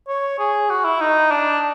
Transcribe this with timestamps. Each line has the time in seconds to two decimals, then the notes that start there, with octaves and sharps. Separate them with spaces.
0.08 C#5
0.39 G#4
0.70 F#4
0.85 E4
1.00 D#4
1.31 D4